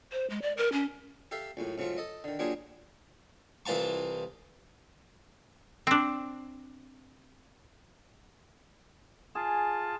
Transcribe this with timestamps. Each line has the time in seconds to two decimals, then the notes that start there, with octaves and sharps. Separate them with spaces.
0.12 C5
0.30 G#3
0.42 D5
0.57 A#4
0.73 C#4
1.31 G4 A4 E5 F5
1.57 C#2 F#2 A2
1.78 G#2 C#3 F#3 A3 F4
1.98 A4 D#5
2.24 D3 D#3
2.39 F#3 A#3 D4 F4 G4 G#4
3.66 C2 E3 F4 A5 C#6
5.87 C4 D4
9.35 F4 G#4 A5